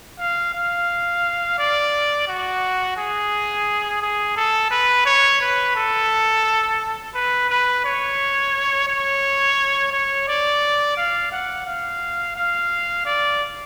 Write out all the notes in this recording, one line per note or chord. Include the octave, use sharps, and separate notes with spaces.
F5
F5
D5
F#4
G#4
G#4
A4
B4
C#5
B4
A4
B4
B4
C#5
C#5
C#5
D5
F5
F#5
F5
F5
D5